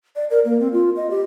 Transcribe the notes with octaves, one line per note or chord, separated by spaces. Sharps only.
D5
A#4
A#3
C4
F4
D#5
G4